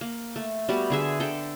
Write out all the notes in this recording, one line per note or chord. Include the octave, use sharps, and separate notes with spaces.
A#3
A3
G3 B3 F#4 G4
D3 G#4 E5
D3 A4 G5